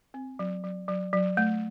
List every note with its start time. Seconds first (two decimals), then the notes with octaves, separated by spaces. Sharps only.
0.14 C4
0.39 F#3
0.64 F#3
0.88 F#3
1.13 F#3
1.37 A3